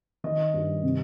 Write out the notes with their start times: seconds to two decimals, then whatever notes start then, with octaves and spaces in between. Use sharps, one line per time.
0.24 D#3 D#5
0.54 G2
0.83 C3